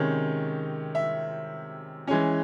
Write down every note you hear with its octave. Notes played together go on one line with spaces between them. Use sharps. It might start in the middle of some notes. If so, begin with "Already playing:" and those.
Already playing: C3 D#3 G#3 C#4 C#5
E5
E3 G#3 C#4 G#5